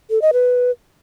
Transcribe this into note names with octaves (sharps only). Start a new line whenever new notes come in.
A4
D#5
B4